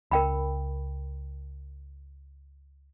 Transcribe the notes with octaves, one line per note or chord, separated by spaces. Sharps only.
C#2 A#4 G5 B5